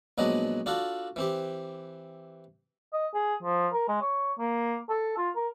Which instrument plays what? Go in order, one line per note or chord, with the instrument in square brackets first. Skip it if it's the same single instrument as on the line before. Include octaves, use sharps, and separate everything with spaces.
[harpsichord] A#1 F#3 G#3 B3 D4 D#5
D4 F4 F#4 A4
E3 C4 G4
[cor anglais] D#5
G#4
F3
A#4
G#3
C#5
A#3
A4
F4
A#4